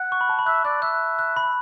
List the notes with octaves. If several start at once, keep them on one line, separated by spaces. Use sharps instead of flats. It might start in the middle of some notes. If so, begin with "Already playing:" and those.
Already playing: F#5
C#6
B5
A5
B5
E5 F#6
D5 F#6
E5 F#6
F#6
B5